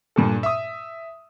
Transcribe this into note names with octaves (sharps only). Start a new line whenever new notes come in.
G2 A#2 A4
E5 D#6